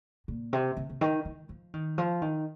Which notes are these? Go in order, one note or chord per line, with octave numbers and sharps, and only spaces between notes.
A#2
C3
C3
C3
D#3
D#3
F3
D#3
F3
D#3